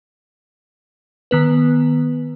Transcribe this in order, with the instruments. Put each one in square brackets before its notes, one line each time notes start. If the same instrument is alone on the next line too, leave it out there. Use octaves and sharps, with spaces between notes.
[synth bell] D#3 B3 B4